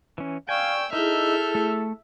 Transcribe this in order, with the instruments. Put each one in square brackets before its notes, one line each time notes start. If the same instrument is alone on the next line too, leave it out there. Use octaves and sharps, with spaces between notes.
[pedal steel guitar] E3 C#4
[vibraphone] D5 C#6 [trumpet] F5 [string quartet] G5 E6 [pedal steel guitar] G#5
[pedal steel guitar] D#4 [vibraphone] E4 G#4 [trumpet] A4 [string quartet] E5 F6 G6
[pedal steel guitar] A3